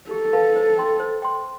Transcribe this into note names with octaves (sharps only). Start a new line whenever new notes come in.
G4 A4
B4 F5 A5
C5
G5 C6
C5
G5 C6